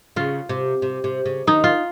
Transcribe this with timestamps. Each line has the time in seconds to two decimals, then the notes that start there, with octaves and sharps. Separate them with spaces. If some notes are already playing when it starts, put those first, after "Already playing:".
0.16 C#3 F4
0.49 C3
0.82 C3
1.04 C3
1.26 C#3
1.47 D#2 D#3 D#4
1.64 F4